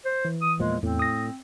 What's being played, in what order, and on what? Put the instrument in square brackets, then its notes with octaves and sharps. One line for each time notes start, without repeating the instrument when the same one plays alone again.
[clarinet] C5
[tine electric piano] E3
[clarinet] D#6
[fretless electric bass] E2 A#2 F3 [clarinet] G#3
[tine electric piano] E2 [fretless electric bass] A2 [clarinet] C4
[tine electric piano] D#6 A#6